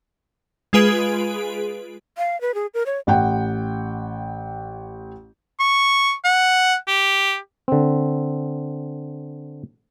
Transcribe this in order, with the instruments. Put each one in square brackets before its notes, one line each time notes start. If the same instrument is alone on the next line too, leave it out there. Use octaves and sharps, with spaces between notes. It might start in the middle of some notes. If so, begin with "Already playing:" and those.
[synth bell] G#3 F4 G#4 B4 D7
[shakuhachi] F5
B4
G#4
A#4
C#5
[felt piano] A1 F#5 G5
[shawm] C#6
F#5
G4
[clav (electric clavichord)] D3 C4